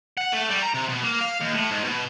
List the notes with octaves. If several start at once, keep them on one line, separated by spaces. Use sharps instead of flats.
F#5
A3
G3
A#5
C3
B2
A#3
F5
D#2
A2
G#2
B2